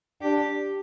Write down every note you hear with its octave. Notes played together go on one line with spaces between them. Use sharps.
D4 G4